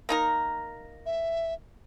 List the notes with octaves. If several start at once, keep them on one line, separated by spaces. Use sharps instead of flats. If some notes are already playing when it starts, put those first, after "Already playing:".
A#3 D#4 A#4
E5